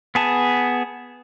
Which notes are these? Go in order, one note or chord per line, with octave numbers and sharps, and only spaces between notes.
B3 G#4 A5